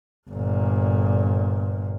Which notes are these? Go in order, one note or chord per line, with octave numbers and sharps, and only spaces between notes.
G1 A#2